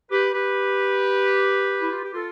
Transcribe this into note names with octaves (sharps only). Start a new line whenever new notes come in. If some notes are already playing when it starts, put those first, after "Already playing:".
G4 B4
G4 B4
E4
F4
G4
F4 A4